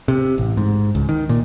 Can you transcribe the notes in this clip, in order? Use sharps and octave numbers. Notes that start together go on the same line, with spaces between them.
C3
A1
G#2
C#2
D#3
A#2